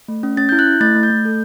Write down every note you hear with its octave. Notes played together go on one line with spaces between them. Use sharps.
A3
C#4
C#4 A6
G6
E4
F#6
E4
A3 A6
A3
G6
A3
A4